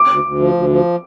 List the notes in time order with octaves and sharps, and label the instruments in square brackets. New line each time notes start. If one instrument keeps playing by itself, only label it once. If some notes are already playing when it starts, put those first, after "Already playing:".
Already playing: [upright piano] D6
[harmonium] D2
D2
F3
D2
F3